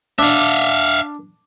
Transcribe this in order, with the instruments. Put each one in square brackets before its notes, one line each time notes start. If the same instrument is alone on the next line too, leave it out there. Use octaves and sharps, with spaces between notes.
[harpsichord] D4 [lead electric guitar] E5 F5